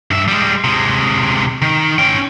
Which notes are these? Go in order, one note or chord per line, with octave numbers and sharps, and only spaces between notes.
G2 E5
G3 G#3
C3 G#3
D#3
C#4 G5